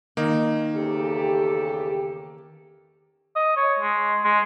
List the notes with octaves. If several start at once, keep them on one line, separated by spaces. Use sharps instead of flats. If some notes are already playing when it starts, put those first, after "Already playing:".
D#3 A#3 D#4
E2 C#3 G4 A4
D#5
C#5
G#3
G#3